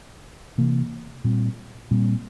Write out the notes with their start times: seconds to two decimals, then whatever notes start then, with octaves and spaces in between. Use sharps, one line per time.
0.58 C3 E3 A#3
1.24 A#2 G3 C4
1.91 A#2 G3 C4